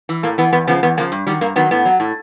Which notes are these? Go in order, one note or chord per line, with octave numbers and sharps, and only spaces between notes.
E3
A2 A#3
E3 B3
E2 B3
C#3 F3 B3
E2 B3
C#3 F3 A#3
G2
D#3 F#3 G3
G2 A#3
D#3 F#3 B3
A2 B3
F#3
A2